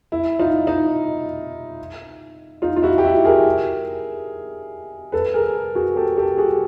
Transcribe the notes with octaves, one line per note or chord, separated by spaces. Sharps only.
E4
D#4 F4
D#4
D#4 F4
F4
E4 F#4
G4
E4 F#4
G#4 A#4
A4 B4
G#4 A#4
F#4 G#4
G4 A4
G4 A4
F#4 G#4